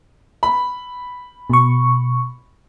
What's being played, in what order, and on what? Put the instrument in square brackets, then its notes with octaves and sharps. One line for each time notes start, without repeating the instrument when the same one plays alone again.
[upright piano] B5
[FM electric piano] B2 C#6